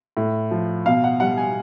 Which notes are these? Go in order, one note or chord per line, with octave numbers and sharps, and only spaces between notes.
A2
F3
B2 F5
F#5
G3 F#5
G#5